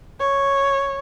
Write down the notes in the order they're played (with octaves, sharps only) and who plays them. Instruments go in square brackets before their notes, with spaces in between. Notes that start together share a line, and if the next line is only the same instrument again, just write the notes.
[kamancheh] C#5